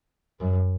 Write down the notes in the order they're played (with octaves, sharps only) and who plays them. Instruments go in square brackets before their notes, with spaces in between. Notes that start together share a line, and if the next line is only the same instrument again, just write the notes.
[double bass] F#2